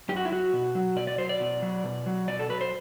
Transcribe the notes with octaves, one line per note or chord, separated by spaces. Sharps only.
F#2 G4
F#4
E4
F#3 F#4
B2
F#3
B2 D5
D5
F#3 C5
D5
B2
F#3
B2
F#3
B2 D5
A4
F#3 B4
C5